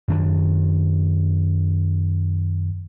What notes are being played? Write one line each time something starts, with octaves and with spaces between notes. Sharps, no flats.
F#2 D#3 C4 D4